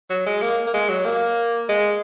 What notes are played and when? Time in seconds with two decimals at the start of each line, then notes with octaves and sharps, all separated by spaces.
0.10 F#3
0.26 G#3
0.42 A#3
0.67 A#3
0.74 G#3
0.89 F#3
1.05 A#3
1.69 G#3